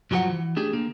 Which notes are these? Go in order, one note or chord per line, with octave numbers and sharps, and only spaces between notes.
G2 F3 F#3 G4 C5 F#5
E3
A3 D4 G4 G#4
D3 A#3